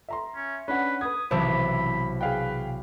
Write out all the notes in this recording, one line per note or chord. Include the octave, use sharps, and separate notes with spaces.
E5 A#5 C6
C#4
C#4 D4 B4 F#5
B4 D#6 G#6
B1 C3 E3 C5 A5 B5 E6
G#4 B4 F5 G5